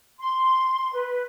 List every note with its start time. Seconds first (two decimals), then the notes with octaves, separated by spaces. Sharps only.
0.20 C6
0.93 B4